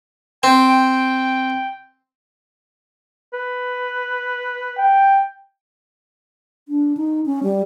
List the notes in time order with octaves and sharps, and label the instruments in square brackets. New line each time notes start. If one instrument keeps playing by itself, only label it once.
[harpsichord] C4 [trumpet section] G5
[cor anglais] B4
[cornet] G5
[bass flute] D4
D#4
C#4
G3